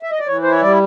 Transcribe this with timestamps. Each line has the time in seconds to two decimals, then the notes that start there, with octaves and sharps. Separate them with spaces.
0.03 E5
0.11 D#5
0.19 D5
0.27 E3 C#5
0.42 E4 C5
0.52 C#5
0.62 G3 D5